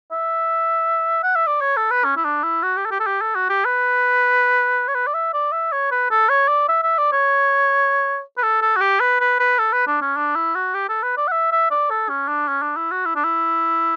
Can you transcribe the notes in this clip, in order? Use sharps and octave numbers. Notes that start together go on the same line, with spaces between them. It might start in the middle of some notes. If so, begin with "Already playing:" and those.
E5
F#5
E5
D5
C#5
A4
B4
C#4
E4
D4
E4
F#4
G4
A4
G4
A4
G4
A4
F#4
G4
B4
C#5
B4
D5
E5
D5
E5
C#5
B4
A4
C#5
D5
E5
E5
D5
C#5
B4
A4
A4
F#4
G4
B4
B4
B4
A4
B4
D4
C#4
D4
E4
F#4
G4
A4
B4
D5
F#5
E5
E5
D5
A4
C#4
D4
C#4
D4
E4
F#4
E4
D4
E4